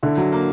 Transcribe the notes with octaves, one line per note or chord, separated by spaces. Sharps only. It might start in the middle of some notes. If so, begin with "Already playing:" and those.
D3 E4
F#3
A#3